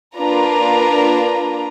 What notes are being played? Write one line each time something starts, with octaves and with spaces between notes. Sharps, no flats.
A#3 D4 F4 B4 A#5